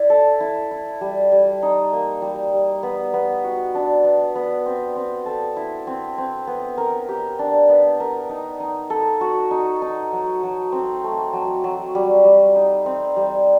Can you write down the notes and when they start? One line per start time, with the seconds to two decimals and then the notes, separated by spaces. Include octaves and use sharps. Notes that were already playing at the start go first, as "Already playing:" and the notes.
Already playing: E4 D5
0.10 A4
0.40 E4
0.71 E4
1.01 G3
1.32 G3
1.62 D#4
1.93 A#3
2.22 G3
2.54 G3
2.83 B3
3.14 B3
3.44 F#4
3.75 D4
4.04 B3
4.35 B3
4.66 C4
4.96 C4
5.26 A4
5.57 E4
5.87 C4
6.18 C4
6.47 B3
6.78 A#4
7.09 G4
7.39 D4
7.69 B3
8.00 A#4
8.29 D#4
8.60 D#4
8.90 A4
9.21 F#4
9.51 D#4
9.82 D#4
10.13 F#3
10.43 F#3
10.72 C4
11.04 A3
11.33 F#3
11.64 F#3
11.95 G3
12.25 G3
12.56 D#4
12.86 C4
13.16 G3